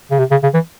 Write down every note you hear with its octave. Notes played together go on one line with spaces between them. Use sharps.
C#3
C3
C#3
C#3
E3